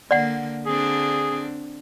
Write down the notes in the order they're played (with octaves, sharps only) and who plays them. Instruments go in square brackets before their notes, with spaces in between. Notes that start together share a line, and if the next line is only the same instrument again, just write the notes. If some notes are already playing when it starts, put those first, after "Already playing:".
[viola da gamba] D3 A#3 [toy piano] D5 F#5
[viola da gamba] D3 C4 D4 [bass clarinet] G#4